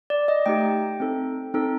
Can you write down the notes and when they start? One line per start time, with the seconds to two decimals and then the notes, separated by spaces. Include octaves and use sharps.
0.10 D5
0.28 D#5
0.46 A3 D#4 G4 G5
1.00 C4 D#4 A4
1.54 C4 D#4 A4